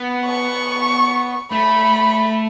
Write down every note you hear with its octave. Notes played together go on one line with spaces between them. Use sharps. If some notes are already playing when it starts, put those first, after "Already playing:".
Already playing: B3
C#6
A3 B5